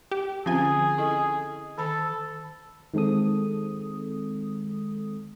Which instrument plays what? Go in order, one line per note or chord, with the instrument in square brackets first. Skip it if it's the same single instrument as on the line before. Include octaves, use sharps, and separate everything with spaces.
[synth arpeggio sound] G4
[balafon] D3 C4 C#4 [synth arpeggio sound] F3 G#5 [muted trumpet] G#4
[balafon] E4 A4 D#5
[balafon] D#3 A5 B5 [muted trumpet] A4
[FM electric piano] D#3 G#3 C4 A4 D#6